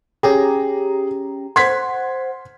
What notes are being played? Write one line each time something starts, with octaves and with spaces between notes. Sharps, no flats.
C#4 G4 G#4 A#5
C5 F#5 C6 G#6 B6